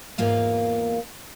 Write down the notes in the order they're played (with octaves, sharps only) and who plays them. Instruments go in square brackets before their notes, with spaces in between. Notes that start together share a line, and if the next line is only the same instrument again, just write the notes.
[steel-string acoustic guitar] E2 G#2 A#3 F4 F5